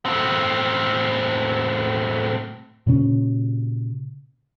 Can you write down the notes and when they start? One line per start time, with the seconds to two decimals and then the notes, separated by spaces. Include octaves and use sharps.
0.05 A2 C4
2.87 A#2 C#3 C#4